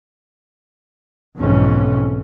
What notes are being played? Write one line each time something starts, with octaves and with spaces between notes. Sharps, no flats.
B1 F2 G#2 B2 E3 C#4